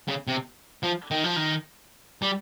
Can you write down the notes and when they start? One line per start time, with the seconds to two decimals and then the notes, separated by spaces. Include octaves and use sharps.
0.08 C#3
0.27 C3
0.83 F3
1.11 D#3
1.24 F3
1.36 D#3
2.22 G3